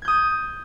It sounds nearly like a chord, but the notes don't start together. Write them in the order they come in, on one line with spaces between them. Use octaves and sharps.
G#6 G6 D#6